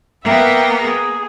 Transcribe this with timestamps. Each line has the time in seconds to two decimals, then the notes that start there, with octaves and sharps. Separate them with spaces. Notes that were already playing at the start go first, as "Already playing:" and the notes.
0.24 A#3 B3 E5 G5
0.81 G#4